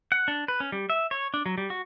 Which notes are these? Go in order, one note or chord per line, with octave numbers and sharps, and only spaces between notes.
F#5
D4
B4
C#4
G3
E5
C#5
D4
F#3
G3
F#4